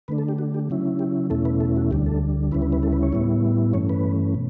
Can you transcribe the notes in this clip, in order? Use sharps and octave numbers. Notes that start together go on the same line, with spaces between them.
D3 A3 D4 B4
A4
G4
F#4
G4
C#3 F#3 C#4 E4
G4
E2 B2 A3 C#4 E4 A4
B4
A4
F#4
D2 D3 G3 D4 G4
A4
D2 C#3 G3 C#4 E4 B4
B4
B4
A4
B4
C#5
A2 G3 B3 E4
G2 E3 A3 C#4 C#5
B4
B2